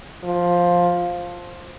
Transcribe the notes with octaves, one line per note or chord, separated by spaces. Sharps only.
F3